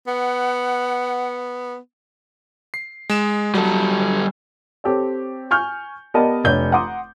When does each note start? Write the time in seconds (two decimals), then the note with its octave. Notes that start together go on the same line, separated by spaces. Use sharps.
0.07 B3 F#5
2.74 C7
3.10 G#3 E7
3.55 F#3 G3 A4
4.84 C4 G4 A4 C#5
5.51 G#5 C#6 F6 G6
6.14 B3 G4 A#4 D5 D#5 A5
6.44 F1 D4 C#5 G6 G7
6.72 F#5 A#5 C6 D6 D#6